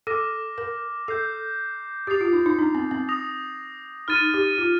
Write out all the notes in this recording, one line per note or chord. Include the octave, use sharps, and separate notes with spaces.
A4 D6 F6 A#6
A#4
A4 G6 C7 F7
G4 D#6 A6 C7 F7
F4
D#4
D#4
D4
C4
C4
D#6 A#6 F7
D#4 F6 A6 D#7
G4
F4